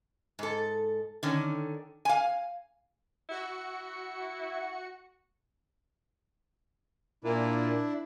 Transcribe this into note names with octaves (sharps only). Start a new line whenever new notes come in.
G#2 A4
D3 D#3 C#4
F5 G#5
E4 F#4 C#7
A#2 D4 E4